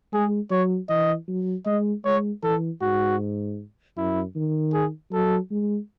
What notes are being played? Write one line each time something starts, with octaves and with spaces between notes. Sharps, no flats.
G#3 G#4
F#3 C#5
E3 D#5
F#3
G#3 D#5
G#3 C#5
E3 A4
G#2 F#4
F#2 E4
D#3
G#4
F#3 A4
G#3